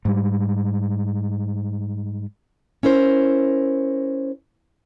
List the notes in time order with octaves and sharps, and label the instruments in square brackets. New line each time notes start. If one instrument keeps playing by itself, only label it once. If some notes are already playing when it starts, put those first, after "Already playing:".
[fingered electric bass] G#2 G3
[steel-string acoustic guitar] C#4 E4 A#4 C5